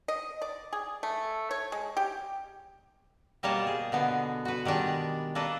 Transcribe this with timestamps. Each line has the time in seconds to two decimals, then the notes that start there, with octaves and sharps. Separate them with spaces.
0.08 D#5
0.42 D5
0.73 G#4
1.03 A3
1.51 C#5
1.72 G#3
1.97 G4
3.43 B2 G3 A#3 C5 C#5 A5
3.67 G#4
3.92 B2 D3 B3
4.45 F#4 B4
4.65 D#3 G3 G#3 D4
5.35 A#3 D4 A4 B4